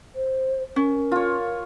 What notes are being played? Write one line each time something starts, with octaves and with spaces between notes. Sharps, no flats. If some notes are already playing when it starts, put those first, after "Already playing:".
C5
C#4 A#4
F4 C#5